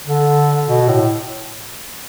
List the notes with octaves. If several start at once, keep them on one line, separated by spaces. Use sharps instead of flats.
D3
B2
A2